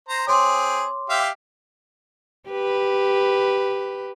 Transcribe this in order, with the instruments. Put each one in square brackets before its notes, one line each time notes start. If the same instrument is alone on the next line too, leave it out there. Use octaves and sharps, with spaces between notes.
[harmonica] C5 A#5
[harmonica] C4 G#4 [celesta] C#5 C6 D6
[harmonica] G4 E5 F5
[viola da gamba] G4 B4